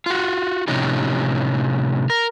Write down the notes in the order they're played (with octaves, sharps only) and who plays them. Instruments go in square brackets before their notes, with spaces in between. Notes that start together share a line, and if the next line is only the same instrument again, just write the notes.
[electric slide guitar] F4 F#4
A2 C3 F3 C#4 D#4 G4
A#4